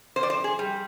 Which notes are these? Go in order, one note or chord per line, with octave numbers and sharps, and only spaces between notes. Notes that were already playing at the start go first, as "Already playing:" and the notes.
F2 C5
D5
C5
G#4
G3